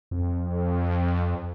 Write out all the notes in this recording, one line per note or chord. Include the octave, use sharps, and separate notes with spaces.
F2